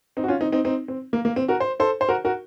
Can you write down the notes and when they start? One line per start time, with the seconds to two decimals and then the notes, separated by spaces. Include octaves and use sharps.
0.17 C4 D#4
0.24 F#4
0.28 C#4 F4
0.41 C4 D#4
0.52 C4 D#4
0.65 C4 D#4
0.88 C4
1.13 A#3
1.25 A#3
1.36 C4
1.48 F#4 A#4
1.60 C5
1.80 A4 C5
2.01 C5
2.09 F#4 A#4
2.25 F#4 A#4